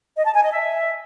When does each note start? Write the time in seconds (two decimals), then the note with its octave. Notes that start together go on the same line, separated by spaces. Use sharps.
0.15 D#5
0.24 A5
0.33 G#5
0.42 D#5
0.52 E5